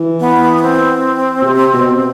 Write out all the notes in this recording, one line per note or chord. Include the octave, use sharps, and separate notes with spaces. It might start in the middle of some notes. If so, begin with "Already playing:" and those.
Already playing: E3
B3
B3
C4
B2
C3
B2